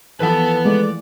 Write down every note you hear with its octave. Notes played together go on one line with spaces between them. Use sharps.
E3 F3 G4 A4 B4 F#5
G#3 A3 D5